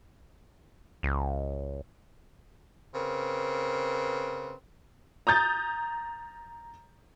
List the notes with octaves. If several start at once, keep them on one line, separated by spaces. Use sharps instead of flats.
C#2
C#3 C4 A#4 B4
A#5 D#6 G6 A6